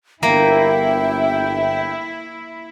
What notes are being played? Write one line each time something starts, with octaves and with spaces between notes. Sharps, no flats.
G1 A#3 E4 E5 G5